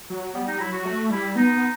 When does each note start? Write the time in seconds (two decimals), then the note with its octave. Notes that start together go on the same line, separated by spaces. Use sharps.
0.10 F#3
0.34 G3 B3
0.47 D#4
0.53 G3
0.60 F#3 E4
0.72 F#4
0.85 A3 F#4
1.10 G3 E4
1.36 B3 D#4
1.52 B3